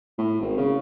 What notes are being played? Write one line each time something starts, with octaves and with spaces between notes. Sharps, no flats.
A2
G#1
C#3